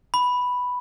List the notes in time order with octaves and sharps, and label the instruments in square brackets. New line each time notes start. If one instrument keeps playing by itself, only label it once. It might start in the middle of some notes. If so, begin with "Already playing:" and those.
[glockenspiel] B5